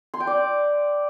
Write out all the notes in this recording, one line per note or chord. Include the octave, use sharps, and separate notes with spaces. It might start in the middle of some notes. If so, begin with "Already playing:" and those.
C6
G5
D5